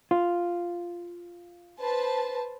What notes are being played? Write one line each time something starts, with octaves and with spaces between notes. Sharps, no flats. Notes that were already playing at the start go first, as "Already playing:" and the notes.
F4
B4 C5 A5